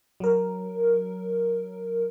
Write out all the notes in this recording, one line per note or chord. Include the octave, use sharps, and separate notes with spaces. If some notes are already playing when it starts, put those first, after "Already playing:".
F#3 A#4